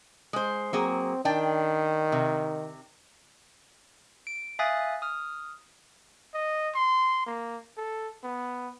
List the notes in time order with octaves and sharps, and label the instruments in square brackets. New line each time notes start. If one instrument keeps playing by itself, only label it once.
[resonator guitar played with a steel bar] G#3 C5
[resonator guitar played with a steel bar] F#3 A#3 G#4 [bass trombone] C4
[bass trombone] D#3 [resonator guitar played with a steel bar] D4 D5 G5
[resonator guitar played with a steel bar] C3
[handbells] D7
E5 F5 G#5 D#6 F#6 A6
D#6 F6
[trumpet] D#5
C6
A#3
A4
B3